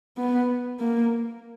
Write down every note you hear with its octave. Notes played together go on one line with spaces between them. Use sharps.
B3
A#3